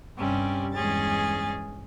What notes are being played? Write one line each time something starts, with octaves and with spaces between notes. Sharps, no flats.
G2 C3 G3 C#4
E2 G2 G#3 C#4 G#4 A6